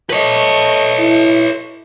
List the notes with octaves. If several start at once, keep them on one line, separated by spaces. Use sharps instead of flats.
A3 B4 C#5 D#5
E4